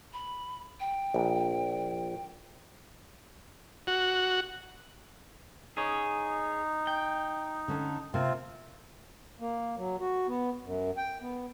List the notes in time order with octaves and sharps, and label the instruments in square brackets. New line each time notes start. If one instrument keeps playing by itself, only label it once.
[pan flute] B5
G5
[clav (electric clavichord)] A#1
[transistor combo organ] F#4
[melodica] D#4 [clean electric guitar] G#4 C#5
[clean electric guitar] G5
[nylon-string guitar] D3 C#4 D4
[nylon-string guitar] C3 A#3 [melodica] C4 F4
[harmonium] A#3
F#3
F#4
B3
F#2
G5
B3